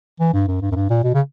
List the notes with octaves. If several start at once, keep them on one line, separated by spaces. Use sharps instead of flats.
E3
G2
F#2
G2
F#2
G2
A#2
B2
C#3